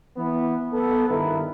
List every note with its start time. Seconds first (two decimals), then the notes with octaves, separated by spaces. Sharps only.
0.17 E3 B3
0.73 B3 A4
1.09 G2 D#3 E4 A#4 B4